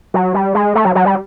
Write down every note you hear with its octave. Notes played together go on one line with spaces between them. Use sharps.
F#3
G3
G#3
A3
F#3
F#3
G3